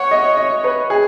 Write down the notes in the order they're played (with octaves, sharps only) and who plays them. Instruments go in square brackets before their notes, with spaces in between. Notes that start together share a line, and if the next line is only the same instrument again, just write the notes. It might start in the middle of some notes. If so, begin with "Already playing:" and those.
Already playing: [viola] C#5 [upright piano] F#5
[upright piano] D#5
D#5
B4
G#4